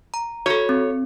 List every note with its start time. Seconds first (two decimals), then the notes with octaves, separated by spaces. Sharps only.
0.14 A#5
0.46 F#4 A4 C#5
0.69 C4